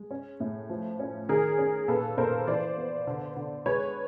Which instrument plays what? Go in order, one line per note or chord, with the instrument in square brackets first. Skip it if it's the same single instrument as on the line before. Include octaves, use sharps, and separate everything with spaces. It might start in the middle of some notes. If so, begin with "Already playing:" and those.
Already playing: [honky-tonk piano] G#3
C#4
A2
F3
C#4
D#3 G#4 A#4
C#4
A#2 A4 B4
A#2 A#4 C5
E3 C5 D5
B3
D3
D3
G#3 B4 C#5